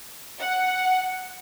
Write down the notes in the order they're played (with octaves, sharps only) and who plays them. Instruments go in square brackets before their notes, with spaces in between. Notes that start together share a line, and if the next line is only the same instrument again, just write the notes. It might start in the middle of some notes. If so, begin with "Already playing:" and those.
[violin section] F#5